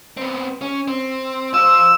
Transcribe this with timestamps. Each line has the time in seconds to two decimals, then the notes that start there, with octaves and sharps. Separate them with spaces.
0.17 B3 C4
0.62 C#4
0.88 C4
1.54 F4 C5 E6